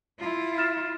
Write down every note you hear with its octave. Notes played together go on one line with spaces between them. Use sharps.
E4 F4
F6 A6 E7